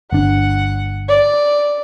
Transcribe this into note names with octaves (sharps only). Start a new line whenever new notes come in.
G1 D4 F#5
D5